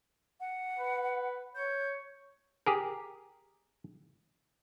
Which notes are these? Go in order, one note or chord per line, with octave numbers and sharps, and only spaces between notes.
F#5
B4
C#5 G6
G4 G#4 A#4